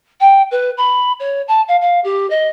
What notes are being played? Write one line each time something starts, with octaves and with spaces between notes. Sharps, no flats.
G5
B4
B5
C#5
A5
F5
F5
G4
D#5